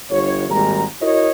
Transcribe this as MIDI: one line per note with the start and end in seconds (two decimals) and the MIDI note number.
0.10 0.46 31
0.10 0.46 73
0.49 0.83 32
0.49 0.83 39
0.49 0.83 55
0.49 0.83 56
0.49 0.83 70
0.49 0.83 82
1.01 1.29 64
1.01 1.29 66
1.01 1.29 70
1.01 1.29 73
1.01 1.29 75